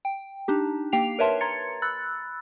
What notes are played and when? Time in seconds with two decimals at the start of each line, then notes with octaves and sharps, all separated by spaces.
0.05 G5
0.48 D4 D#4 G4
0.92 A#3 G4 G5 C7 F7
1.19 A#4 B4 C#5 E5 A5 C6
1.41 A#5 C6 G#6 A6 C#7
1.82 B5 E6 F#6 A6